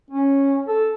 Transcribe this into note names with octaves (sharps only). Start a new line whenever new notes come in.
C#4
A4